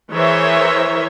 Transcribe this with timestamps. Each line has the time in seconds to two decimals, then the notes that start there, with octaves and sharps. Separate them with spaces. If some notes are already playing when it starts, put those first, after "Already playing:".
0.12 E3 G#4 A#4 C5 C#5 E5